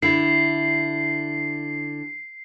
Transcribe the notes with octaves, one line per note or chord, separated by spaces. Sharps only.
D3 E4 C7